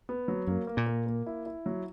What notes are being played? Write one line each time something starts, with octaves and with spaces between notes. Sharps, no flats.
B3
F#3
F#2 A#3
A#3
A#2
A#3
A#3
E4
E4
F#3